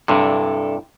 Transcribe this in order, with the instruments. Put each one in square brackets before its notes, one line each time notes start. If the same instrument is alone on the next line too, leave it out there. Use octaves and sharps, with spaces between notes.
[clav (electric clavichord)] G2 C3 [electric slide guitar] D4 E4 A4